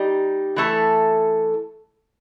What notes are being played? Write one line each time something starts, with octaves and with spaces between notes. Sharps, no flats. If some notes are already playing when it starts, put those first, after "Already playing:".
Already playing: G3 D#4 G4
E3 A3 E4 A4